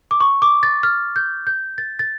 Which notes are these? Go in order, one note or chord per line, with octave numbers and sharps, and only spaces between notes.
D6
C#6
D6
A6
F6
G6
G6
A6
A6